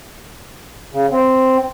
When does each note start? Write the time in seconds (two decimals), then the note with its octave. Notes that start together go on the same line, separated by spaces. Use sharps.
0.94 C#3
1.12 C4